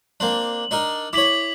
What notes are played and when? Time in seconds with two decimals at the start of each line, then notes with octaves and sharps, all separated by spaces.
0.20 A#3 C4 D4 F#7
0.71 D4 D#4 A#4
1.13 E4 C#5 D6 B6 F#7